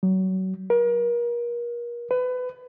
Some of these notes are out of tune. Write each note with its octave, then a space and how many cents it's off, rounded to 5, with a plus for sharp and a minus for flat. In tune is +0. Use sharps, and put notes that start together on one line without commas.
F#3 +25
A#4 +35
B4 +25